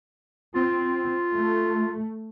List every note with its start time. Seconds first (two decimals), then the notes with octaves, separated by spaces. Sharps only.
0.55 C4 F4
1.35 A3